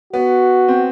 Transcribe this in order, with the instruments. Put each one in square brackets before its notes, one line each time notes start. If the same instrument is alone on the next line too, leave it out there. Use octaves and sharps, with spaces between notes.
[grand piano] B3 [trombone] F#4
[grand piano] C4